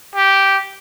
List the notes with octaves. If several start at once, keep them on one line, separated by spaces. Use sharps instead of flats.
G4